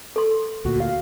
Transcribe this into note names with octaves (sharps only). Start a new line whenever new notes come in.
A4 C6
D2 A#2 F#4
F5